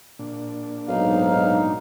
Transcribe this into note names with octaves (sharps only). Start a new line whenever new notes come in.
A#2 D4
B1 G#2 D#4 F5